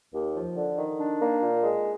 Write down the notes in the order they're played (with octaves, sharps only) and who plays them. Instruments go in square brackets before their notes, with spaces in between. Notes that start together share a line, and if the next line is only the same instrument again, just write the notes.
[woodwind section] D#2
F3
D3
D#3
D4
A#3
A#2
G#3